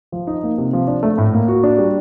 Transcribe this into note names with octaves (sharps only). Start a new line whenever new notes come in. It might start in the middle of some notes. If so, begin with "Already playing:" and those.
F3
D#4
A#3
C3
F3
D4
A3
A2
A#3
F#4
D4
G3